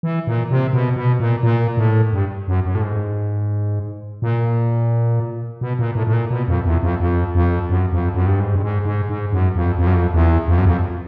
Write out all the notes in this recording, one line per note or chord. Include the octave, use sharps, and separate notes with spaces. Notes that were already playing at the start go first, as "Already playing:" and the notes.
E3
A#2
C3
B2
B2
A#2
A#2
A2
G2
F#2
F#2
A2
G#2
A#2
B2
A#2
A2
A2
A#2
B2
F2
E2
F2
F2
F2
F#2
F2
F#2
G2
G#2
G2
G#2
G#2
G#2
F#2
F2
F2
F#2
F2
E2
F2
F#2
F2